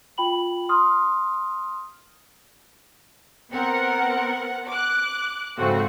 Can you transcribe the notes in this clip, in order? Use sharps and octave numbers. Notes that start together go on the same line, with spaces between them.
F4 G5 B5 F#7
C6 D#6 F6
B3 C4 A#4 F#5
D6 F#6
G#2 C#3 F3 A3 C4 F#4